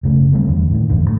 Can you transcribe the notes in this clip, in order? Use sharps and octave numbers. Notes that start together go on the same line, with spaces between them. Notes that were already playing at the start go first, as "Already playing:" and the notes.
F#1 C#3 A3
D3 G3 A3 C4
E2 D3
A2 D#3
G1 E2 D3
A2 D3 A3